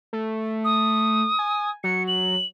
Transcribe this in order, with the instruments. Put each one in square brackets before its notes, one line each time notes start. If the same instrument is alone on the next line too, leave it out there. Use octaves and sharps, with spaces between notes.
[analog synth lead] A3
[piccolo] D#6
[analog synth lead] G#5
[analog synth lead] F#3 [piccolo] C#7
[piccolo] F#7